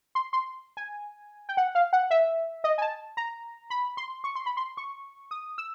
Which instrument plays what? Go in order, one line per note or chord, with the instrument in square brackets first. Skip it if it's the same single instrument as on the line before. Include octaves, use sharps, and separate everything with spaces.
[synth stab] C6
C6
G#5
G5
F#5
F5
F#5
E5
D#5
G#5
A5
A#5
B5
C6
C#6
C6
B5
C6
C#6
D#6
E6